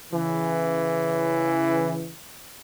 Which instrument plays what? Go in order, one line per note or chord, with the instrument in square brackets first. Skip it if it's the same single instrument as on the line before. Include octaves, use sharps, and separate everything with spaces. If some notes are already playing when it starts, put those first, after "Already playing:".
[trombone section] C#3 E3